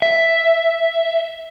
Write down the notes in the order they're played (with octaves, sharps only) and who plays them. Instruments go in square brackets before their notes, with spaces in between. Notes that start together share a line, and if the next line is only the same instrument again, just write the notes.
[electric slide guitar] E5